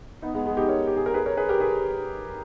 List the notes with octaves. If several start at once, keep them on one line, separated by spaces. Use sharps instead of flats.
B3 D#4
G#3 B3
G#3 B3
D#4 G4
A#4 C#5
G4
G#4
A#4
G#4 B4
A#4 C#5
G#4 B4
G4 A#4
G#4 B4